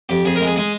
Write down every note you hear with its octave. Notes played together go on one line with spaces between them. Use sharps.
F2 G4
F2 G#4
A#4
G#3
G#4
G#3 G#4